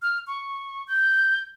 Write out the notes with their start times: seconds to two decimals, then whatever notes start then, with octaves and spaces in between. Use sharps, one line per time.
0.02 F6
0.27 C#6
0.87 G6